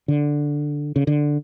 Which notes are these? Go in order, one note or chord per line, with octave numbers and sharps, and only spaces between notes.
D3
C#3
D3